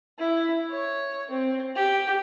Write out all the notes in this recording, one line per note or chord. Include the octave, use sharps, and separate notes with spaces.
E4
C#5
C4
G4